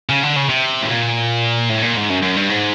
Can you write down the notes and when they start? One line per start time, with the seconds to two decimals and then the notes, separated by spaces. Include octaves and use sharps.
0.09 C#3
0.23 D3
0.36 C#3
0.49 C3
0.81 A2
0.89 A#2
1.69 A2
1.82 A#2
1.97 G#2
2.10 F#2
2.22 F#2
2.37 G2
2.49 G#2